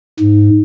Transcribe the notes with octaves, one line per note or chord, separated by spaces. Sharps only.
G#2